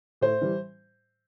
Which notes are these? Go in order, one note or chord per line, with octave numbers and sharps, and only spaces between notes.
A2 C5
E3 G3